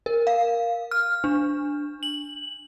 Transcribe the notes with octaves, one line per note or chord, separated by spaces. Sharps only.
A#4
F5
F6
D4
F#7